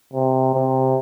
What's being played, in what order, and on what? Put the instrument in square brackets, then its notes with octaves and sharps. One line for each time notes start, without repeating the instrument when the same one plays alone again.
[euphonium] C3
C3